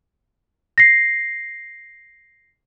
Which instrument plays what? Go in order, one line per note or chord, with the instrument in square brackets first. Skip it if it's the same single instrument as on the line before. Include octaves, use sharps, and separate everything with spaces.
[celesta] A#6 C7